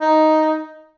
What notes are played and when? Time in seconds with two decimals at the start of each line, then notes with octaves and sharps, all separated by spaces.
0.01 D#4